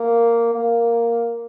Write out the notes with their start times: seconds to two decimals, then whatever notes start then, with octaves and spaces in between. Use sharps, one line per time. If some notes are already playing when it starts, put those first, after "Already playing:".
Already playing: A#3
0.54 A#3